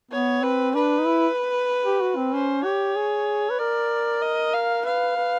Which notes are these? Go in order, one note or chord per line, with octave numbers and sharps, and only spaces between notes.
B3 C#5
C4 B4
D4 B4
D#4
E4
G4
F#4
C4
C#4 C5
G4 C#5
G#4
B4
A#4 D5
D#5
F5
B4 F5
B4